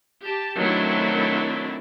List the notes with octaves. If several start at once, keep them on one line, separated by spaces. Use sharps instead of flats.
G4 A5
D#3 F#3 A3 C4 D4 E4